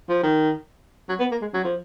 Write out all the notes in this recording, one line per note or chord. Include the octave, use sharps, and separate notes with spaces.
F3
D#3
F#3
B3
A#3
G#3
F#3
F3